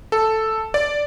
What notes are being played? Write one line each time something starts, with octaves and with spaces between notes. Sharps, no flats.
A4
D5